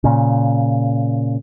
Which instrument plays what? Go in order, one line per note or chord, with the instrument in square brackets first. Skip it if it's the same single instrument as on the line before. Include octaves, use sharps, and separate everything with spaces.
[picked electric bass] A#2 C#3